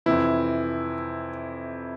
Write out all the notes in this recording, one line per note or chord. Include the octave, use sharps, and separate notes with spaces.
F2 C3 E3 E4